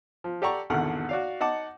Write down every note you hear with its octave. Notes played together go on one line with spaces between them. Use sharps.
F3
G4 A4 D5 F#5 A#5 C#6
G#1 E2 B2 D3 F#5 F6
F#4 D5 F5
D#4 F#5 A5 D6